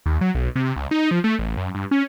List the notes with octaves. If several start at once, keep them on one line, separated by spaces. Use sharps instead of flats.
D#2
F#3
B1
C3
C#2
D#4
F3
A3
A1
F#2
G2
C#4